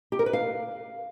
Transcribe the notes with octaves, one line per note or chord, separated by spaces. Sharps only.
G4
A#4
B4
F5